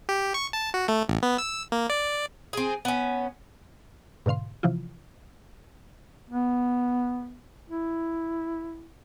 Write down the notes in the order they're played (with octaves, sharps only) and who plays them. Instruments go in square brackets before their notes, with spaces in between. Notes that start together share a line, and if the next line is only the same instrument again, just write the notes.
[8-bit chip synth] G4
C#6
A5
F#4
A3
A1
B3
E6
A#3
D5
[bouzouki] C4 G#4
B3 C#4
[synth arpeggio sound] G#2 B2 D3 F5 C6
C3 E3 F3 E4 F4
[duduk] B3
E4